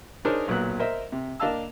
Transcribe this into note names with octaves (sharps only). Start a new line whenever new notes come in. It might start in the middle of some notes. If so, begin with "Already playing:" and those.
D4 D#4 G#4 A#4 C5 C#5
B1 A#2 F#3 B3 F#6
A#4 C5 D#5 E5
C3
A#3 D4 D#5 F5 A5 E6